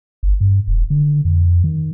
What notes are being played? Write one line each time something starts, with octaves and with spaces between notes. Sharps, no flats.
G1
G2
E1
D3
F2
D#3